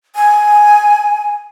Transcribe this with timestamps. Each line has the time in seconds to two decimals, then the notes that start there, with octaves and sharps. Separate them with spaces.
0.15 G#5